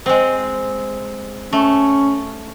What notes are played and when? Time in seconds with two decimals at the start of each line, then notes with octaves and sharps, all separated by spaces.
0.06 G#3 C4
1.53 A3 C#4